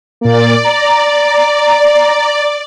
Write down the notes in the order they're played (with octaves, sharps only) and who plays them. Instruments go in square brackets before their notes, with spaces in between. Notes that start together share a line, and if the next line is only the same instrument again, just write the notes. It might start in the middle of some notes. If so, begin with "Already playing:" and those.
[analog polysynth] A#2 A#3 [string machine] D5
[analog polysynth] A#5